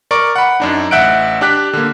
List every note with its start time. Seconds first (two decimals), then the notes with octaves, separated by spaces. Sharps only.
0.11 A#4 D5 C#6 D7
0.36 F#5 B5
0.60 F#2 D4 D#4
0.91 A1 E5 F#5 F#6 G6 D7
1.41 D4 G4 F#6 B6
1.73 D3 A#3